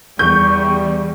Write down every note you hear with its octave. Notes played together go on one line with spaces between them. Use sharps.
E2 G3 C#6 G6